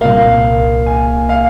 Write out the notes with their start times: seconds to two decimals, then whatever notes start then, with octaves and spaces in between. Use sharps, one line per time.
0.01 C2 A#2 A#3 F5
0.86 G#5
1.29 F5